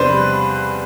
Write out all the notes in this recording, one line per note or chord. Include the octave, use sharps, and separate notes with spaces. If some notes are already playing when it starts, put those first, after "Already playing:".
Already playing: E2 C3 F3 D4 B4 C5
G3